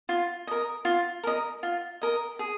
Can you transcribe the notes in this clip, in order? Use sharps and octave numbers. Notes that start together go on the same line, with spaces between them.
F4
A#4 D#5
F4
A#4 D#5
F4
A#4 D#5
G#4